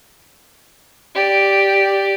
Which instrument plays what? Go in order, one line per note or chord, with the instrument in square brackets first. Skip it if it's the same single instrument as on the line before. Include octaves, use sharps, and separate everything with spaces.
[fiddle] G4 D5